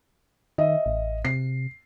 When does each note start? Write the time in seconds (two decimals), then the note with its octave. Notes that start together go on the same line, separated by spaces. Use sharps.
0.58 D#3 D#5 E5
0.86 A1
1.25 C3 C7